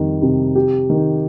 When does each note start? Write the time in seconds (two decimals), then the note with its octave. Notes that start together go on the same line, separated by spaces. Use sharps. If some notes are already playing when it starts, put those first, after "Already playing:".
Already playing: F2 D#3 G3
0.22 C3
0.55 G4
0.90 D#3